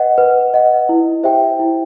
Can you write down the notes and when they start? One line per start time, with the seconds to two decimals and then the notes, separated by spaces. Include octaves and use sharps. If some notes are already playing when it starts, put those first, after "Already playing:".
Already playing: B4 D#5 F#5
0.18 B4
0.54 D#5 F#5
0.89 E4
1.23 G4 C5 E5 G5
1.59 E4